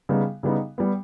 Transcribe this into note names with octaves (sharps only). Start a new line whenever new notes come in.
C#3 G3 B3 D#4
C#3 G3 B3 D#4
G3 B3